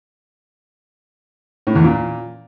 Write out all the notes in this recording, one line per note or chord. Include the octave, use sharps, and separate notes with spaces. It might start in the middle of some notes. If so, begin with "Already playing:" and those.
A2
E2
A#2